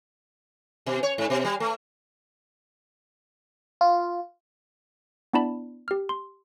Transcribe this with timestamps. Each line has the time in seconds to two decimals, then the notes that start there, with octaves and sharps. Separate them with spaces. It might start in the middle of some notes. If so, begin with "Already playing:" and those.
0.86 B2
1.03 C#5
1.18 G#2
1.30 B2
1.45 G3
1.60 A3
3.81 F4
5.33 B3 D4 E4 D5 A5 B5
5.88 G4 F6
6.09 C6